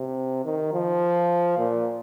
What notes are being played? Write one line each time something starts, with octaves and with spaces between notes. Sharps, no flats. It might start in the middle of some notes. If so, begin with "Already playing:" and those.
Already playing: C3
D#3
F3
A#2